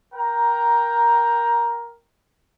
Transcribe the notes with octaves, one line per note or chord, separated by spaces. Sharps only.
A#4 G5 A#5